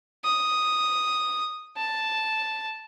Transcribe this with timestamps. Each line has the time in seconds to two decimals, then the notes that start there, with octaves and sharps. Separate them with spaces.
0.25 D#6
1.77 A5